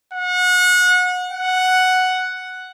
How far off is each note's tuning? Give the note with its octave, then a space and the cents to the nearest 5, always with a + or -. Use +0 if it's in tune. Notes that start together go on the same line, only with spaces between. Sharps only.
F#5 -30
F#5 +0